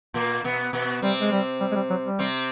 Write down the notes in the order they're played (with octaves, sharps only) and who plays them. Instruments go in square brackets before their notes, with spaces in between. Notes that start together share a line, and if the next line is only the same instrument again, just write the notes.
[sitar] A#2 A#3
B2 B3
B2 B3
[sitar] C3 C4 [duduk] G3
[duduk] G#3
G3
G3
G#3
G3
F#3
G3
[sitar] C3 C4